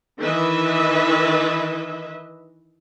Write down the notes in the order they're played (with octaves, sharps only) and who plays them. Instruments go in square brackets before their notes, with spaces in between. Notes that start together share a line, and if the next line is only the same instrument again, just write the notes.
[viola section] D#3 E3 B4 D#5 E5